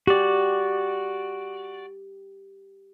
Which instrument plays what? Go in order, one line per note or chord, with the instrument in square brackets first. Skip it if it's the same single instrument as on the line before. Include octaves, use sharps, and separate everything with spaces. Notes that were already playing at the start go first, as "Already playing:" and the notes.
[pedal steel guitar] F#4 D5 [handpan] G4